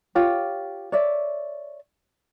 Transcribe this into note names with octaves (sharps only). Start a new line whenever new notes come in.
F4 G4 C#5
C#5 D5 E5